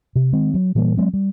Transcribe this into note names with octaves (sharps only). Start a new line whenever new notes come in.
C3
D#3 G#3 C4
F#3
A#2 E3 G3 A#3
F#3 G#3 C4
G3